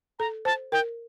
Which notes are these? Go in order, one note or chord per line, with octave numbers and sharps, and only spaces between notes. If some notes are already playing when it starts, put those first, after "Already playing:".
A4 A#5
C5 A5
A#4 G5